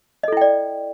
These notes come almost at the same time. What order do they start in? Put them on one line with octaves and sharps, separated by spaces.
D#5 A4 E4 G5 D5